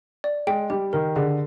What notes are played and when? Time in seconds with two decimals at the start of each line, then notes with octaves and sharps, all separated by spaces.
0.24 D5
0.47 G#3 G5
0.70 G3 G4
0.93 D#3 A#4
1.16 D3 G#4